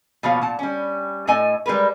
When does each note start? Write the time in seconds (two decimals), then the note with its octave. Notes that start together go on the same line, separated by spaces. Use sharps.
0.23 B2 F3 A#3 F4 C#5 F5
0.42 A#2 A5
0.59 G3 C#4
1.27 A2 A4 D#5 G#5
1.66 G3 G#3 A#4 B4